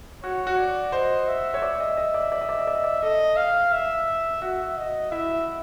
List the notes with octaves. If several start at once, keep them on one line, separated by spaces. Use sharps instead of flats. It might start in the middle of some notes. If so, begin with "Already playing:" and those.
F#4 C#5
F#4
D5
C5 D#5
E5
C#5
D5
D#5
D#5
D5
D5
D#5
D5
D#5
D5
D#5
D5
A4 D#5
F5
E5
F#4 E5
D#5
E4 E5